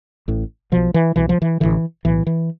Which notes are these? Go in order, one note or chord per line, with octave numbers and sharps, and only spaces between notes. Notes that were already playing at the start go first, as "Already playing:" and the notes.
A1 A2
B1 B2 F3
E3
C2 B2 E3
F3
E3
A1 G2 D3 E3
B1 A2 E3
E3